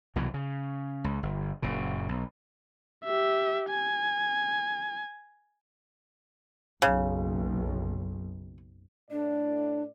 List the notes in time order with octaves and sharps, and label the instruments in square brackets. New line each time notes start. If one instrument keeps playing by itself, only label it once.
[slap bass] C2 B2 E3 F#3
C#3
C#2
G1
F#1 A#2 C#3
B1
[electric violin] G4 E5
G#5
[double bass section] F#1 B1 [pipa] C#3
[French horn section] A2 D5 [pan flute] D4